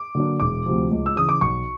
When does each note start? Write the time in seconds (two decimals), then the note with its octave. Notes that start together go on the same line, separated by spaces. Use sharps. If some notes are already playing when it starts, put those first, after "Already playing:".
Already playing: D6
0.15 D3 F#3 A#3 D4
0.40 E1 D6
0.66 D2 C3 F3
0.91 C#2
1.06 E6
1.16 C#3 E3 D#6
1.29 D6
1.41 B1 C#6